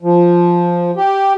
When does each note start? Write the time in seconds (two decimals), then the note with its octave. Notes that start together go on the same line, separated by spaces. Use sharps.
0.02 F3
0.97 G4